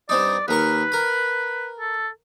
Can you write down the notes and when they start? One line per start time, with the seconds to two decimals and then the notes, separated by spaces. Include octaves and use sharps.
0.09 G2 C4 D#4 D5
0.48 D#2 A#4 B4 C#6
0.92 A#4 B5
1.79 A4